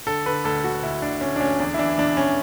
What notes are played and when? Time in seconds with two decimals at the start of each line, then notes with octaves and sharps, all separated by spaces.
0.06 D3 A4
0.26 D3 B4
0.44 D2 A4
0.64 D2 F#4
0.83 D2 E4
1.02 D2 D4
1.21 D2 C#4
1.36 D4
1.40 D2 C#4
1.59 E2 D4
1.74 E4
1.79 E3 D4
1.98 E2 D4
2.17 E2 C#4